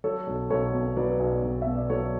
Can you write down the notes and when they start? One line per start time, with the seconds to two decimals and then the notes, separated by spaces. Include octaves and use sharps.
0.04 F#3 A4 C#5
0.27 B1
0.50 B1 A4 C#5
0.74 B2
0.97 F#3 B4 D5
1.20 B1
1.43 B1
1.62 B2 E5
1.76 D5
1.90 F#3 A4 C#5